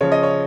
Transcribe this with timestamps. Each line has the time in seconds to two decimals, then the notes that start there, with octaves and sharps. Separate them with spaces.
0.01 C#3 F3 C#5
0.12 D#5
0.23 C#5